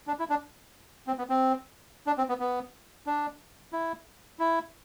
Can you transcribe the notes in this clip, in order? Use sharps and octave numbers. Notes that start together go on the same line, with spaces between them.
D4
E4
D4
C4
B3
C4
D4
C4
B3
B3
D4
E4
E4